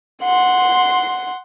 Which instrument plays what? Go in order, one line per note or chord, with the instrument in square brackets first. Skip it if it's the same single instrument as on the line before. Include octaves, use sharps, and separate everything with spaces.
[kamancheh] F#5 C6